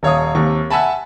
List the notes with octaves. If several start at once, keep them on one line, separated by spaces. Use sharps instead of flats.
D#1 C#5 F5 D#6
D#2 C3 C#6
E5 F#5 G#5 A5 B5